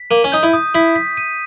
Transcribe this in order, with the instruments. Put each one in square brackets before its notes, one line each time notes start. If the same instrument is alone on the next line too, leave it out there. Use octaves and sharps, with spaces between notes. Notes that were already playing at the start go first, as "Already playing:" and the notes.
Already playing: [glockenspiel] B6
[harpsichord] A#3 [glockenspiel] D#7
[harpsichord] C#4
[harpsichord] D#4 [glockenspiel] G6
[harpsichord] E4
[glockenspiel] D#6
[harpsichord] E4 [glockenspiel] B6
[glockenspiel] B6
D#7